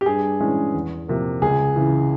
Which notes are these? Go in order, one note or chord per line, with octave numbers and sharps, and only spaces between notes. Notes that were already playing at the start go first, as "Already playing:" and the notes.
G4
G2 G#4
E3 G#3 C#4
E2
C3 F3 A#3
C#2 G#4
C#3 E3